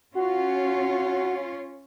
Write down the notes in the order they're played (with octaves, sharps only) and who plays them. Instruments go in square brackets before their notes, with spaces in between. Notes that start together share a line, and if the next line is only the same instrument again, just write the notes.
[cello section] C#4 F4 C#5 [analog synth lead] F#4